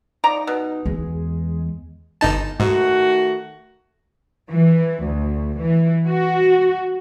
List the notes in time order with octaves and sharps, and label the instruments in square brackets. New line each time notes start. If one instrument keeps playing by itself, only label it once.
[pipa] F3 D5 A#5 [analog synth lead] D#4
[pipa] B2
[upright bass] E2 [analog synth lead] G#3
[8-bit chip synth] G1 D#4 A5
[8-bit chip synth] G#2 [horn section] D#3 A3 F#4
[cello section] E3
D2
E3
F#4